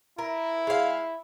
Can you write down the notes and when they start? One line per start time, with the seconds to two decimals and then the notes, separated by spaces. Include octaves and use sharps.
0.18 E4 A#4
0.67 G#3 F5